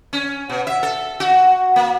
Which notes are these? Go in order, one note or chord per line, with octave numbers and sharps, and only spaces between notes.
C#4
B2
E5
A4
F#4
A#3